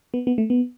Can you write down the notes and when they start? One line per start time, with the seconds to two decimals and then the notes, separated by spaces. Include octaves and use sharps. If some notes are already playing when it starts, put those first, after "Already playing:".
0.14 B3
0.27 B3
0.38 A3
0.50 B3